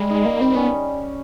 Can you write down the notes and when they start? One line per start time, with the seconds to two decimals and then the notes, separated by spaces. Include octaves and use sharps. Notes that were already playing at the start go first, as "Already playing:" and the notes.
Already playing: G3 G#3
0.10 D#4
0.24 D#3 A#3
0.40 G3 C4
0.55 B3 C#4